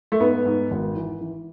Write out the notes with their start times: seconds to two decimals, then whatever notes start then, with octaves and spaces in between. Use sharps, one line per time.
0.12 A3
0.20 G#2 B3
0.46 G#2
0.71 G#1
0.96 E3
1.21 E3